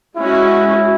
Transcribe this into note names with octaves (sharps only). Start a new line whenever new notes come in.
G#3 C#4 E4 F#4